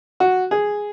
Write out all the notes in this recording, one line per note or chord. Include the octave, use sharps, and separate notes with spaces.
F#4
G#4